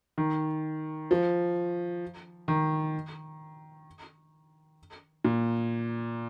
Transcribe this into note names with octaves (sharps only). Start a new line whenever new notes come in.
D#3
F3
D#3
A#2